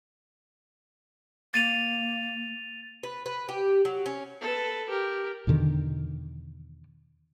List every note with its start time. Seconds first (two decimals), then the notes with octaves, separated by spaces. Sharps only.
1.54 A#3 A6 D#7 F7
3.03 B4
3.26 B4
3.49 G4
3.85 F#3
4.06 C#4
4.41 A4 B4
4.89 G4 A#4
5.47 E2 B2 D3 D#3